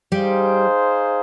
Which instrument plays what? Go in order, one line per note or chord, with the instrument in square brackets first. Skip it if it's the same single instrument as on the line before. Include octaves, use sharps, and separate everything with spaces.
[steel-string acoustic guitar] G3 G4 [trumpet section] D#4 G#4 C5 F5